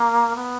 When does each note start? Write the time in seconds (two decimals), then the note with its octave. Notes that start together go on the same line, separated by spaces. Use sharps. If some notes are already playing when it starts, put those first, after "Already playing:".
Already playing: A#3
0.36 B3